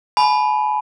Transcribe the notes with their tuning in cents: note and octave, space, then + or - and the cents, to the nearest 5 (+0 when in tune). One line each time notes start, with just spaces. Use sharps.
G#5 +40 B5 +0